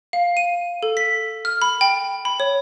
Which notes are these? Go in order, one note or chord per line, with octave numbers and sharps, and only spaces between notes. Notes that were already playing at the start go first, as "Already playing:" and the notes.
F5
D#7
A4
B6
F6
B5
G5
B5
C#5